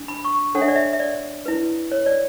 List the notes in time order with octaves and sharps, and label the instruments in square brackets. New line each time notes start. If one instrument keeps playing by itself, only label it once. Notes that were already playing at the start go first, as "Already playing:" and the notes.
Already playing: [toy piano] D4
B5
C#6
D4 A4 C#5 F#5
E5
D5
E5
E5
D5
E4 B4
C#5
D5